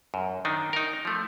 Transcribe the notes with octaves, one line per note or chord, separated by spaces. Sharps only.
F#2
D#3 D4 D#4
D#4 A#4
F3 A3